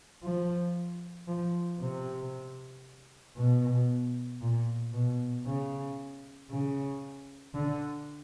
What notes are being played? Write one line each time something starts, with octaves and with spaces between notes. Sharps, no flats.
F3
F3
C3
B2
A#2
B2
C#3
C#3
D3